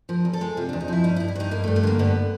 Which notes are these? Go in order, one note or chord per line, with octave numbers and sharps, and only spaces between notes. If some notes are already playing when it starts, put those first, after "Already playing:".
F3 A#4
E2
A4
G#3
C3 F4
E2 D4
D#4
F3 E4
G2 D#4
E4
G2
E4
G2 D#4
G2 A#3
A3
G2
A3
D3 A#3
G2 B3